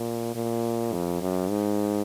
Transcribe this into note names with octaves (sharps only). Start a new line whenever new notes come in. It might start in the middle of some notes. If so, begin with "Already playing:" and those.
Already playing: A#2
A#2
F2
F#2
G#2